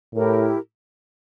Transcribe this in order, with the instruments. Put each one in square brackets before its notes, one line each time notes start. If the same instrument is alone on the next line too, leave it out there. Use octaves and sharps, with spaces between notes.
[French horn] A2 [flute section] E4 G4 A#4